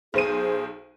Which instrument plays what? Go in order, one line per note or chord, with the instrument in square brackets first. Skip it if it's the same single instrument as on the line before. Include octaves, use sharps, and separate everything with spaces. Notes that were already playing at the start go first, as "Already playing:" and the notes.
[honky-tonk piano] B1 C5 D#7 [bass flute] G#4